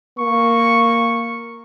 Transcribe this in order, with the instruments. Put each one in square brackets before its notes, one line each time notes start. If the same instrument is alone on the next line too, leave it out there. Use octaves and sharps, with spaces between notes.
[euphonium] A#3 [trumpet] C#6